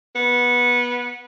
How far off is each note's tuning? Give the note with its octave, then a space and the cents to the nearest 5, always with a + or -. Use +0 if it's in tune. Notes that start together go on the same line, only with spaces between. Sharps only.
B3 -20